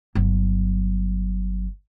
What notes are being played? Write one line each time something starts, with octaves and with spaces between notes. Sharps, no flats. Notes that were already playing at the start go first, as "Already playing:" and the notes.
G1 F#3